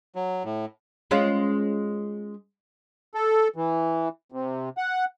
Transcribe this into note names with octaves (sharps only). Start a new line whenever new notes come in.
F#3
A2
G#3 C#4 F4
A4
E3
C3
F#5